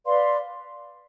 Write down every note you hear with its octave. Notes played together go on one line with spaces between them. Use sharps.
B4 D5 F5 C6